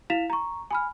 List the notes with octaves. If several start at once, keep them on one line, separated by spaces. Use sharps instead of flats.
E4 F5 B6 E7 F7
A#5 C#6
G#5 B5 F6